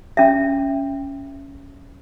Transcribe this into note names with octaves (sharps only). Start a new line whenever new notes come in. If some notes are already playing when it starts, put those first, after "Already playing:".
C#4 E5